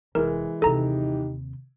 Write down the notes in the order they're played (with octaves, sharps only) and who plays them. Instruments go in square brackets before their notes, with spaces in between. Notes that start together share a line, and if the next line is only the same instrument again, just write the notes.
[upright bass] F1 [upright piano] E3 G#3 [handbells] A#4
[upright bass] D#2 C3 [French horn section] D#4 G4 [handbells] A4 A#5